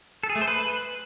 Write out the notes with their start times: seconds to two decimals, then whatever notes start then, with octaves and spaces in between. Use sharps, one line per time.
0.23 A4
0.29 G#4
0.36 A3
0.42 C5
0.48 B4